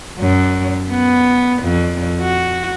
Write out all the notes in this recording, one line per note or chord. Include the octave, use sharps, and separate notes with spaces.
F#2
B3
F2
F#4